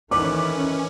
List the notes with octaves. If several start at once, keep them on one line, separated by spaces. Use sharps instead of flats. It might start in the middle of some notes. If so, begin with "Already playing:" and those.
D#3 E3 A3 C4 C#4 B4 D6